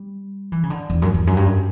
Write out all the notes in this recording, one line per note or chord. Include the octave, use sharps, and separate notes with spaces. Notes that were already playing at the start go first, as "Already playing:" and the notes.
Already playing: G3
E3
C#3
D3
E2
F#2
E2
F#2
G2
F#2